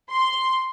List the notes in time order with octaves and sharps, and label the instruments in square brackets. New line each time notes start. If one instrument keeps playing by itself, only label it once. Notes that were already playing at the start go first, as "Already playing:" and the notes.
[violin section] C6